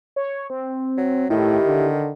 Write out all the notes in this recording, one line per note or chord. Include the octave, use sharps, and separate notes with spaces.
C#5
C4
F#3
A2 D#3 E4 G4
D3